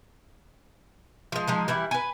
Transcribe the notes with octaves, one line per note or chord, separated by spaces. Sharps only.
F3 G#3
F3 G#3 D#4
E3 G3 E4
B4 G#5